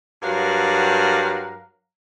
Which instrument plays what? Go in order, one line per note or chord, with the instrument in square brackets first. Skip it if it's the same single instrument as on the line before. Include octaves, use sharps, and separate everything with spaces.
[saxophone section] G2 F#3 A#4 F5 F#5